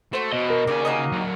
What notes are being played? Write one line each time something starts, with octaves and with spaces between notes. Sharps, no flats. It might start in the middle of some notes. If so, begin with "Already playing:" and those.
A3 F#4 C5
E2 B2 D#5
A#4
D#2 C#3 D5 G#5
A#3 F#4 D#5
D3 F#3